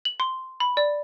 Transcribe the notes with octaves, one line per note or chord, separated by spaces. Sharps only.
F#7
C6
B5
D5